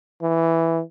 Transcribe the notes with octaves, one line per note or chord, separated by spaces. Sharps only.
E3